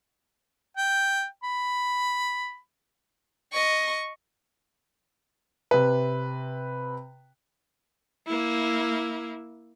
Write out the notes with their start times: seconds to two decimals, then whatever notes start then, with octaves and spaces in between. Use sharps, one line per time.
0.77 G5
1.44 B5
3.53 D#5 C#6
5.71 C3 B4
8.27 A#3 E4